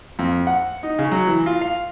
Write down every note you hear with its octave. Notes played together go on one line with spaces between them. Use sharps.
F2
F#5
D#4
C#3
F#3
E3
F4
F5